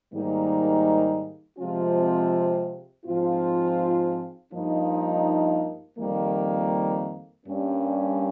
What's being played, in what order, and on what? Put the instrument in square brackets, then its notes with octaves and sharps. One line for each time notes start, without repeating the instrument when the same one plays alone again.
[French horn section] G#2 D#3 G3 A#3 D#4
C3 F3 G#3 C4 F4
G#2 F3 C4 F4
G2 F3 A#3 D#4
F2 D#3 G3 A#3
G2 G3 A#3 C#4